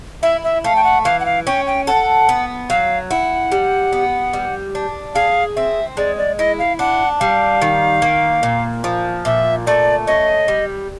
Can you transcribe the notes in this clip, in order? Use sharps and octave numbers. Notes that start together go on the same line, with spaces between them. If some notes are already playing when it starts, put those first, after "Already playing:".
E4 E5
E5
A3 F5
G5
F#5
E3 F5
F#5
F5
C#4 G5
G5
A4 F#5
B3
F#3 F5
E4 F#5
G3
B3
G3
D4
G#4 F5
C4 E5
G#3 D5
D5
E4 D#5
F5
D4 F#5
G3 F5
D#3
A#3
A#2
F3
A#2 E5
A3 D5
C#4 D#5
G3